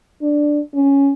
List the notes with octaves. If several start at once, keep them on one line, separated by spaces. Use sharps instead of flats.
D4
C#4